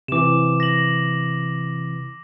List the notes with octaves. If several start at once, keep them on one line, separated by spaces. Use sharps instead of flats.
C3 E3 D6 E7
A#6 F#7